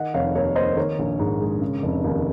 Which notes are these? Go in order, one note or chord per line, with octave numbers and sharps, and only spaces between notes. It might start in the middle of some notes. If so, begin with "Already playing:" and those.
Already playing: D#3 D#5 F#5
F1 C#5 F5
D#2 A#4 C#5
A#3 C5 D#5
D#3 A#4 C#5
A#1
G#2
G#3
C#3
F1
D#2